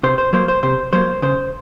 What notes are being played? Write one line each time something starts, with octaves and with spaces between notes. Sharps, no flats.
C3 C5
C5
F#3 A#3 C5
C5
C3 C5
F#3 A#3 C5
C#3 C5